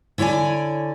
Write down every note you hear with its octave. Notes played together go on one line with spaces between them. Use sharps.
D3 E4 C#5 D5 G#5